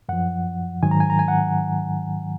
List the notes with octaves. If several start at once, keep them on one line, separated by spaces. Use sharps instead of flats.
F#2 F3 F#5
G#2 D#3 F#3 G#5
A#5
G#5
A#5
G#5
F#5